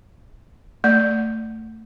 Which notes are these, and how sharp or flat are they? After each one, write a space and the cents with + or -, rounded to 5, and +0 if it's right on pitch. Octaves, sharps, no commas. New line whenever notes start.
A3 +20 D5 +0